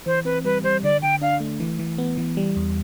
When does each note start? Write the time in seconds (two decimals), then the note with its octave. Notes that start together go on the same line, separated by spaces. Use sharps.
0.06 E3 C5
0.25 C4 B4
0.45 G3 B4
0.64 G3 C5
0.83 D3 D5
1.02 D3 G5
1.21 D4 F5
1.40 A3
1.60 E3
1.79 E3
1.98 B3
2.17 E3
2.37 G3
2.56 E2